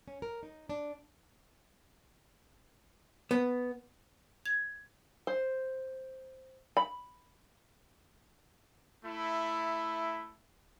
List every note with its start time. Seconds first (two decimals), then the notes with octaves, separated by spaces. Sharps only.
0.08 C#4
0.22 A#4
0.43 D#4
0.69 D4
3.31 B3
4.46 G#6
5.27 C5
6.77 B5
9.05 A3 E4